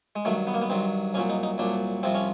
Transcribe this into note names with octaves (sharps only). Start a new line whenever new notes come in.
G#3
G2 D#3 F#3 A3
B3
A#3
B3
G2 D#3 F#3 C4
C2 A#2 F#3 C#4
D#4
D#4
C2 A#2 F#3 D4
C2 C3 F3 C4
C#4